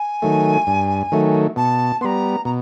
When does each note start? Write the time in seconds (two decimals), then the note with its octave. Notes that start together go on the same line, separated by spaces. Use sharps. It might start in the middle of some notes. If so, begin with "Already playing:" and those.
Already playing: G#5
0.22 D#3 F#3 A3
0.67 G2
1.12 D#3 F#3 A3
1.56 B2 A5
2.01 G3 B3 A#5 C6
2.45 B2 A#5